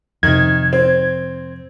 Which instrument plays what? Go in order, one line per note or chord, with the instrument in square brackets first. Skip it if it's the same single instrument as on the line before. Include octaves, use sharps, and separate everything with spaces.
[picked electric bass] F2 C3 [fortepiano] D#3 [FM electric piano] G#6
[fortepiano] C4